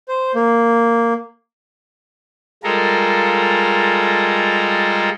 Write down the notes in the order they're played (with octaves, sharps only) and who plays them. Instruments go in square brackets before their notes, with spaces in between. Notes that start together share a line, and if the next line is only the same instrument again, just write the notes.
[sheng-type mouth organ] C5
A#3
[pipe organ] G3 G#3 F4 A4 A#4